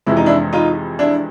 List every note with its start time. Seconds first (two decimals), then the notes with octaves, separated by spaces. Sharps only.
0.06 F2 C3 E3 G#3 E4
0.17 D#4
0.26 D4 E4
0.53 D#4 F4
0.99 D4 E4